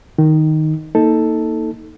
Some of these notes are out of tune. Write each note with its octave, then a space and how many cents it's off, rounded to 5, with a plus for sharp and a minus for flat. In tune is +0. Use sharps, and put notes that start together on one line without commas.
D#3 +0 D#4 +0
A#3 +0 D#4 +20 A4 +0